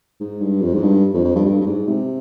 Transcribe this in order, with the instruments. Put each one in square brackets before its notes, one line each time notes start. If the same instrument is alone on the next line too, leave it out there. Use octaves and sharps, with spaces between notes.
[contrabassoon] G#2
G2
F2
G#2
G2
F2
F2
G2
G2
G2
G#2
C3